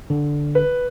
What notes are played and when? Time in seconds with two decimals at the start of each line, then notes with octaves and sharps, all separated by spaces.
0.10 D3
0.55 B4